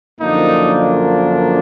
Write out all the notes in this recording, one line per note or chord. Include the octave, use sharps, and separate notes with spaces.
F#2 D3 F3 A#3 D4 D#4